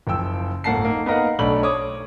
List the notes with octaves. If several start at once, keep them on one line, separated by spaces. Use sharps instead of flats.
F#1 F3 G5 E6
D1 G1 A#3 F#5 A5 C7
A#3 D#4
B3 D#4 A#4 D#5 F5 F#5
B1 A3 D4 B5 F#7
C#5 D6 D#6